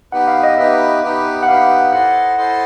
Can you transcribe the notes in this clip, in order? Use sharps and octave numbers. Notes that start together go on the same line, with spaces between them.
B3 D#4 G4 B4 F#5
F5
D#5
B3 D#4 G4 B4 E5
B3 D#4 G4 B4
F#5
B3 D#4 G4 B4 F5
E4 A4 C5 D#5 F#5
E4 A4 C5 D#5